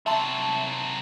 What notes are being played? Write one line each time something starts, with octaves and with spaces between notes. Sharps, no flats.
C3 F#3 E5 A5 C6